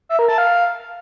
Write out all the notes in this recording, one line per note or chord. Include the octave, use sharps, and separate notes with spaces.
E5
A#4
A5
F5